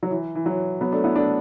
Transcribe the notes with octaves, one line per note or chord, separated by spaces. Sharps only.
F#3
E3
E3
F#3
F#3 B3
A3 D4
B3 E4
A3 D4